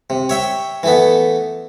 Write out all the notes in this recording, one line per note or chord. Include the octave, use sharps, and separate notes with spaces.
C3
C#5 E5 G5
E3 A3 B3